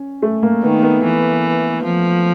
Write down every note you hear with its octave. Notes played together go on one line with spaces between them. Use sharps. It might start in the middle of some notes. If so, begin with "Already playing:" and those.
Already playing: C#4
A3
A#3
D#3 B3
B3
E3
F3